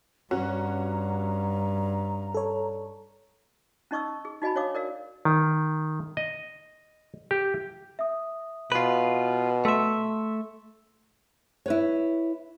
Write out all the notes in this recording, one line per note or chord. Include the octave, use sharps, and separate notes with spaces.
G2 C#4 F#4 A#5
A4 C#5
C#4 D#4 D#5 C#6 D#6 E6
G#4
D#4 F#4 D#5 G#5 B5
D4 C#5 D#5 F5 D6 D#6
A#4 D5 F5
D#3
D#5
G4
E5 D#6
B2 F4 B4
A3 E5 C6 E6 B6
E4 B4 C#5